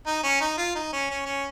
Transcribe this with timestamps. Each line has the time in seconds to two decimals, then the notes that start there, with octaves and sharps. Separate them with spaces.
0.07 D#4
0.24 C#4
0.41 D#4
0.58 F4
0.75 D#4
0.93 C#4
1.10 C#4
1.26 C#4